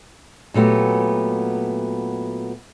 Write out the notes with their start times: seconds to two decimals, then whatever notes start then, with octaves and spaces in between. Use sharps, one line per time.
0.54 A#2 F#3 A3 B3 G4